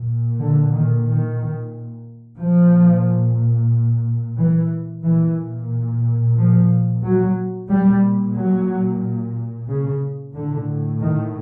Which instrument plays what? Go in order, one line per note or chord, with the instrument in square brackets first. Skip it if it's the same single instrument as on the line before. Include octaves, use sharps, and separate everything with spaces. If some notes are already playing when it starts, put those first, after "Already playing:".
Already playing: [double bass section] A#2
D3
D#3
D#3
A#2 F3
E3
A#2 E3
F3
F#3
A#2 G3
F#3
C#3
A2 D3
D#3